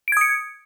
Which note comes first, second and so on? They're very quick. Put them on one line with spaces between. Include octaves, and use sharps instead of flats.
D7 G#6 D#6 C#7